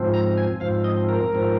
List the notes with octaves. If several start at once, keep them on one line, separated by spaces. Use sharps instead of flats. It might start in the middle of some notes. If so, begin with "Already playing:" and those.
Already playing: G#2 F3 C4
A#5
G#5
G#2 F3 C4 F5
D#5
A#4
G#2 F3 C4